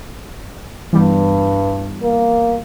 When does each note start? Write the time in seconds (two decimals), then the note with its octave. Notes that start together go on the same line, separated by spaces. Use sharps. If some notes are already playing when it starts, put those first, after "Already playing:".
0.93 G2 E3 G3 B3
2.03 A#3